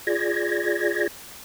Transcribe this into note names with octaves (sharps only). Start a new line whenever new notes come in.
F4 G#4 D5 G#6 A#6